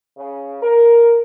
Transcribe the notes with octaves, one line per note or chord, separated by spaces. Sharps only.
C#3
A#4